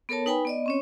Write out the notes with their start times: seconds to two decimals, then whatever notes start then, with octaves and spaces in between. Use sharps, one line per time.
0.09 B3 A4 A#4 C#5 A5
0.26 D#4 B4 G5 G#5 B5
0.45 B3 D5 D#5
0.66 C4 C#4 C#5